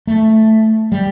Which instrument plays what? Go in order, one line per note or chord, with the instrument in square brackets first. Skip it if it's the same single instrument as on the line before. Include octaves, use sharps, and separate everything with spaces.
[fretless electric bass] A3
G3